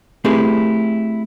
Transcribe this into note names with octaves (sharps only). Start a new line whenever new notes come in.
A3 C4 E4 G4 G#4 B4